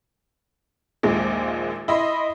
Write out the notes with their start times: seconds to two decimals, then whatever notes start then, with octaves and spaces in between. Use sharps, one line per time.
1.03 A#1 D#2 A#2 G#3
1.88 E4 D#5 B5 C6